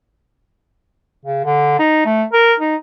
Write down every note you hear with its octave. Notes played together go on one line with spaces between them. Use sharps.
C#3
D3
D#4
A3
A#4
D#4